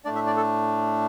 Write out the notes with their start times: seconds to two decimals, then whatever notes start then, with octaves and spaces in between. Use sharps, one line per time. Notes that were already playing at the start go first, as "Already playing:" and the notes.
0.05 A2 A3 D4 D5
0.15 E5
0.26 D5
0.37 A4